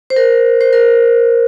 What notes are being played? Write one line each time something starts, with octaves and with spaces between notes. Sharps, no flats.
C5
A#4
C5
A#4